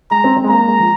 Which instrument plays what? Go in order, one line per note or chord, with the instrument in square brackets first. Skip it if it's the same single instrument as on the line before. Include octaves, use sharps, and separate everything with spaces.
[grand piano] G#3 [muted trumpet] A#5
[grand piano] C4
C4
G#3
[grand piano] A#3 [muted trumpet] A#5
[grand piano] G#3
F3